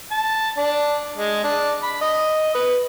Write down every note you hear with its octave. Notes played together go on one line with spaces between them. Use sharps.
A5
D4
G#3
D4
B5
D#5
B4